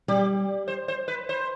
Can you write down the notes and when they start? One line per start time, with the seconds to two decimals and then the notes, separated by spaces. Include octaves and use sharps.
0.08 G3 G4
0.68 C5
0.88 C5
1.08 B4
1.29 C5